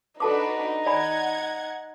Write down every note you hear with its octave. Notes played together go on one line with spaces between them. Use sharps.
D4 D#4 F#4 A4 B4 A5 D6
D5 F#5 G#5 B5 G#6